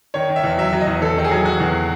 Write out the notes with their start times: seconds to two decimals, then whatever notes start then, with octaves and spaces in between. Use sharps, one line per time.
0.14 D#3 C#5
0.29 D#3
0.36 E5
0.44 E2
0.58 F#3 E5
0.73 F#3
0.81 D#5
0.87 E2
1.02 E2 A4
1.16 D#3 A4
1.24 G#4
1.31 F#3
1.45 F#3 F#4
1.60 E2